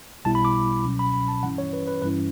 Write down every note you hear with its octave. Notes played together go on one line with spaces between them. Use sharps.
B1 B2 G3 B3 E4 A5
B5
D6
C#2 B2 F#3 C#4
B5
B5
A5
G2 E3 G3 C#4 E4 F#5
C#5
B4
B4
G2 E3 G3 C#4 E4 B4